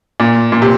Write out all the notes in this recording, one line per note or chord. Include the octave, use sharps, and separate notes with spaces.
A#2
A#2
C3